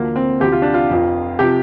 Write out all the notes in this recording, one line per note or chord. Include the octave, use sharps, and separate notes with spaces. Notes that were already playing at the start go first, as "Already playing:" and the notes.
Already playing: D2 D3 F3 A#3
C4
D2 C3 F3 G4
F4
D4
F4
F1 F2 F3
C3 F3 G4